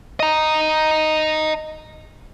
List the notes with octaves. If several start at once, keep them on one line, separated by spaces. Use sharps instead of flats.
D#5 A#5